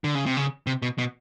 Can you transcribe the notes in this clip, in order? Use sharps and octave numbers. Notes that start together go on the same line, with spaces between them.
D3
C#3
C3
C#3
C3
B2
B2